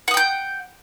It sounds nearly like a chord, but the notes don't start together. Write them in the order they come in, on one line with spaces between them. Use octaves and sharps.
F#5 D#6 G5 G6